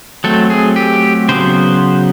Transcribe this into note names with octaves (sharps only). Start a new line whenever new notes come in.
F#3 A3 C4 A4
G#4
G4
C#3 F#3 B3 C5